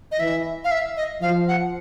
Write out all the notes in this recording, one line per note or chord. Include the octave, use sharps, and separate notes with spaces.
D#5
E3 E5
F5
E5
D#5
F3 F5
F#5